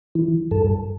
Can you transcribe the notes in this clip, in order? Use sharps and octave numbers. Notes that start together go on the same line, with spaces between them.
E3
G2 A4